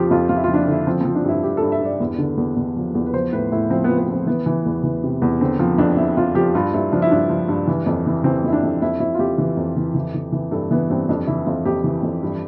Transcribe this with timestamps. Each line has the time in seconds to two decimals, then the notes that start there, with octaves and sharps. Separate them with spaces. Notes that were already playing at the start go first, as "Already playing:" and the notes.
Already playing: F2 F3 F4 G4
0.11 F2 F4
0.29 F2 F4
0.37 E4
0.44 F3 F4
0.54 D4
0.58 E4
0.67 D3
0.72 E4
0.87 F3 C4
1.01 F3 C4
1.15 D4
1.25 G2 E4
1.43 G2 G4
1.57 G2 A4
1.72 E5
1.81 G2 D5
2.00 E2
2.18 D3
2.37 E2
2.56 E2
2.76 F3
2.95 E2
3.06 B4
3.13 F3 C5
3.32 A2 B4
3.52 A2 E4
3.70 F3 C4
3.84 F3 B3
3.98 B3
4.08 F3 C4
4.27 E3 B3
4.46 E3
4.66 E2
4.83 E3
5.03 C3
5.22 E2
5.41 D3 C4
5.59 F3 C4
5.78 F2 D4
5.97 F2 E4
6.17 F2 F4
6.35 F3 G4
6.55 G2 F4
6.74 G2 E4
6.92 F3 D4
7.02 E4
7.11 G2 D4
7.30 F3
7.49 G2
7.67 E3
7.86 F2
8.06 E3
8.24 E3 C4
8.44 F2 E4
8.53 D4
8.63 F2
8.82 F2 E4
9.00 F2 E4
9.14 F4
9.19 F2 G4
9.38 E3
9.57 F2
9.76 E3
9.95 E3
10.14 E3
10.32 E3
10.51 G2 A4
10.71 E3 B3
10.90 G2 C4
11.09 F2 D4
11.27 E3 E4
11.46 F2 F4
11.65 F2 G4
11.84 E3
12.03 F2
12.23 G2